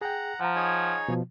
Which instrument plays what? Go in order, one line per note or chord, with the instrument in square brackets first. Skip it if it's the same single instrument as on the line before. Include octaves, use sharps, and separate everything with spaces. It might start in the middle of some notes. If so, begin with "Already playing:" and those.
[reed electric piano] G#4 G5 [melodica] F#5 A#5
[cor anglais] F3 [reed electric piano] F#5 A#5
[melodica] D#4 G#4 C#5
[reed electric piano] B2 F3